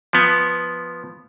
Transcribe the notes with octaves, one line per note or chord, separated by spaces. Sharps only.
F3 B3